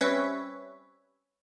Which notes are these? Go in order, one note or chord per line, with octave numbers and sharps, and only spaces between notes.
G3 C4 C#4 B4 C#5 E5